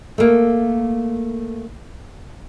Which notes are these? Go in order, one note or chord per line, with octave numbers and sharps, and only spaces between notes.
A3 A#3